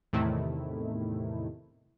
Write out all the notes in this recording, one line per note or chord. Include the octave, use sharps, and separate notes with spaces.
E2 A2 C3 D#3 A3 E4